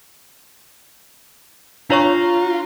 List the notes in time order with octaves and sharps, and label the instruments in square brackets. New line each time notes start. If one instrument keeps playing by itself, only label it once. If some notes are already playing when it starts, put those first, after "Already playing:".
[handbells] D4 C#5 C#6 [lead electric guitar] F4 [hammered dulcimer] A#5